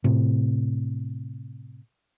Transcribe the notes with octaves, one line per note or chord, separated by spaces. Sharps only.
A2 C3